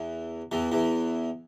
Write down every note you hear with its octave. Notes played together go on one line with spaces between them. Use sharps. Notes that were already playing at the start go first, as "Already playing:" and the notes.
Already playing: E2 E3
E2 E3
E2 E3